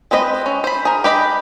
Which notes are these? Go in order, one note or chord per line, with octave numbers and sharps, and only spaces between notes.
G#3 C4 B4 D#5
C#4
C5 B5
G#4 A#4
G4 B4 D#5 B5